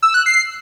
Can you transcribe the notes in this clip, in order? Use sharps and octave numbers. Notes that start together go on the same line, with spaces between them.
E6
F#6
C7